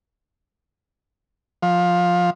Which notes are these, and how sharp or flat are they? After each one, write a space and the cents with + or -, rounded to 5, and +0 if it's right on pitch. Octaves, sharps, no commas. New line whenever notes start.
F3 +15